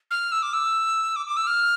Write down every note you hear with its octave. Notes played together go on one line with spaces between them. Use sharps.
F6
E6
D6
E6
D6
D6
E6
F6